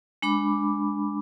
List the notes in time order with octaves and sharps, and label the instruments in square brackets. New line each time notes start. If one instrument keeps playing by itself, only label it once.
[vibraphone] G#3 D4 B5 D6